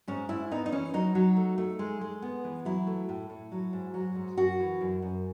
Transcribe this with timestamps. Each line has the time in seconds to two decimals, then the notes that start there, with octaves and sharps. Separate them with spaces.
0.08 G#2 C#4
0.29 G#2 E4
0.51 B3 D#4
0.66 D#4
0.72 E3 C#4
0.94 F#3 D#4
1.15 F#3
1.37 A3
1.58 A3
1.79 G#3
2.01 G#3
2.22 B3
2.44 E3
2.65 F#3 E4
2.87 A3
3.09 A2
3.30 A2
3.52 F#3
3.73 G#2
3.94 F#3
4.15 G#2
4.37 F#2 F#4
4.60 E3
4.81 F#2
5.02 F#2